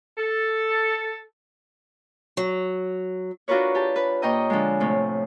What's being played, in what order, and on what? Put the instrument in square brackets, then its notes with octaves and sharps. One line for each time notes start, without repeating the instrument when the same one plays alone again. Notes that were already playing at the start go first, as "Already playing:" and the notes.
[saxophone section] A4
[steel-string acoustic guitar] F#3
[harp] D4 F4 F#4 A#4 B4 C#5
G4 A5
B4
A#2 C#5 D#5 G5 A#5 D#6
D3 F3 G#3
A2 C3